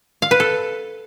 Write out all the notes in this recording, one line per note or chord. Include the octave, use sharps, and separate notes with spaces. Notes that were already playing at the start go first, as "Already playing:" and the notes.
F5
B4
A4